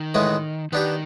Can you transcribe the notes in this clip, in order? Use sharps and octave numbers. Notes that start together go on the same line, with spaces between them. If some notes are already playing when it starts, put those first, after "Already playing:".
Already playing: D#3
A2 E3 G#3 B3
D#3 B3 D4 G4